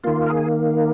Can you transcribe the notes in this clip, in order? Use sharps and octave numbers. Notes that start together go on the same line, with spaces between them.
D#3 A#3 F4
A#4
G#4